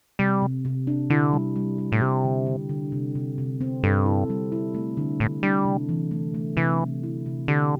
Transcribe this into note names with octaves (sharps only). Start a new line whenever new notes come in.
C3 G3
C3
C3
D4
D3 E4
G3
G3
G3
A2
C3 G4
D3
D3
D3
C3
C3
C3
C4
G2 A4
E4
G3
E4
A3
D3
A2 D3
G3 D4
C3
E3
A3
A3
C3 E3
C3
E4
C3
D3 G4